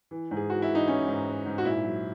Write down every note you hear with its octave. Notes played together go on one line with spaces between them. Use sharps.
E3
G#2
G#4
E3 F#4
E4
E3
D#4
E3 C#4
G#2
G#2
G#2
F#4
A#2 E4
F#3